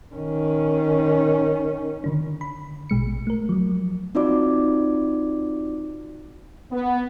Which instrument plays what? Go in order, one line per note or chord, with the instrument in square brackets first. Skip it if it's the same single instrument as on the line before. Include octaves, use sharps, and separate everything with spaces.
[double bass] D#3 C#4
[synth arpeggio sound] D3 D#3 D4
B5
A1 B2 G#3 C#7
A3 A#4
F3 F#3
[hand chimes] C4 D#4 F4 F#4 D5 D6
[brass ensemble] B3